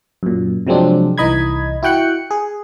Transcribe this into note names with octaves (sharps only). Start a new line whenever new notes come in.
F#2 A#2
C3 F3 F#3 G#3 C4 D4
C2 E3 D#4 D#5 B5 G#6
E4 F#4 G5 F#6 C#7
G#4